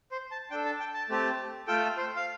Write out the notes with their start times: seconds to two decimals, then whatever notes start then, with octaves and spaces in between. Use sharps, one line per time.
0.12 C5
0.31 A5
0.51 D4 A4 G5
0.65 A5
0.80 G5
0.94 A5
1.09 A3 C4 G4 A5
1.67 A3 F4 A4 G5
1.97 C5
2.16 F5